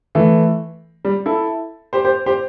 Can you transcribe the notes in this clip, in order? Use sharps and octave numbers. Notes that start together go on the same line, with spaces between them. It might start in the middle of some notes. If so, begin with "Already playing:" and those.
E3 A3
G3
E4 A4
G4 C5
G4 C5
G4 C5